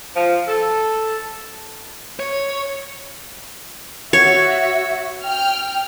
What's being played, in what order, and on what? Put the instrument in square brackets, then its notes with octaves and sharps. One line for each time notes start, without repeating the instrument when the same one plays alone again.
[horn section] F3
A4
[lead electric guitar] C#5
[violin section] F#4 E5 [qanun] C#5
[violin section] G5 F6